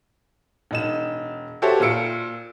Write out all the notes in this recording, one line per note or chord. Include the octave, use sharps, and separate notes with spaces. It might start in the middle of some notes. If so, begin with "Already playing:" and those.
E1 D#4 E7
F#4 G4 A4 C5 C#5 E5
A#2 F4 E6 C#7 D7